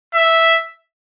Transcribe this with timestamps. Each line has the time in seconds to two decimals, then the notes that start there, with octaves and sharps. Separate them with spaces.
0.14 E5